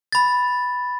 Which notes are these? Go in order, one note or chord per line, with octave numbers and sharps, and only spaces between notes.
B5 A6